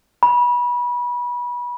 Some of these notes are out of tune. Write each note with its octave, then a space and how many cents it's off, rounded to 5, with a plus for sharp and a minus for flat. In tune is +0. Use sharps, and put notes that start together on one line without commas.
B5 -25